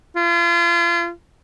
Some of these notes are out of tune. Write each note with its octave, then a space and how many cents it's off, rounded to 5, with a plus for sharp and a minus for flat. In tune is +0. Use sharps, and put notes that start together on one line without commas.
F4 -35